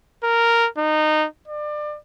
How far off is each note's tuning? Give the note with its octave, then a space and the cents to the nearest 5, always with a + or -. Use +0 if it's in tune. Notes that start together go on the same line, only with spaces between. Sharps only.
A#4 -5
D#4 -20
D5 +30